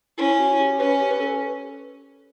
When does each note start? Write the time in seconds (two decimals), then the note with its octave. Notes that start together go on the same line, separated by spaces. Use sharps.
0.17 C#4 E4
0.39 F#4
0.60 G4
0.79 C#4 B4
1.00 G4
1.11 B4
1.20 A4